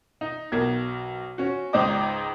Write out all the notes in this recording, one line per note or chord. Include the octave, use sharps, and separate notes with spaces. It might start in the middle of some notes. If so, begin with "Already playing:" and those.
D#4
B1 A#4 G#6
C#4 F#4
C#2 G#2 D#4 C5 D#5 D6